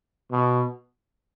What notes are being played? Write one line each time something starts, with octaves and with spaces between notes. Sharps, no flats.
B2